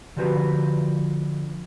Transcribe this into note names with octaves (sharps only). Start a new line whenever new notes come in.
D3 F3 F#4 G4 B4